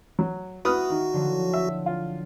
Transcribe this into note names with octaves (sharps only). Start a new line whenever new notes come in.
F#3
E4 F#4 B4 F#5 C#6 D#6 F6
D#3
D3 F3 F#3
E5
F4